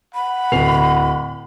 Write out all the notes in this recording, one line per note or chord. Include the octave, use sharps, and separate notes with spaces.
F#5 B5
D1 C7 F7